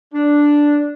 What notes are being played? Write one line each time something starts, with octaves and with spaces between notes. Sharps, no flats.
D4